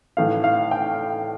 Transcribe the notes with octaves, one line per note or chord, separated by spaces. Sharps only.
A2 E3 F5
F5
G5